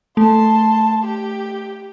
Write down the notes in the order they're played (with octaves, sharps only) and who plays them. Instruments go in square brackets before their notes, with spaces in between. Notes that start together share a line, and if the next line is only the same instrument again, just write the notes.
[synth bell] A3 [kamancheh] A5 C6
[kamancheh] G4